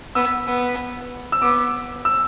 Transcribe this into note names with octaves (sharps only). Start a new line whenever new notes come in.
B3 E6
B3
E6
B3 D6
E6